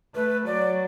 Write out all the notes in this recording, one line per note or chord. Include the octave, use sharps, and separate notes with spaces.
A3 B4
F#3 D5